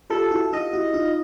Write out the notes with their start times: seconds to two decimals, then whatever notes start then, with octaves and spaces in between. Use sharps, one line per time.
0.10 F4 G4 A4
0.31 E4 F#4
0.52 D#4 F4 D#5
0.73 E4 F#4
0.94 D#4 F4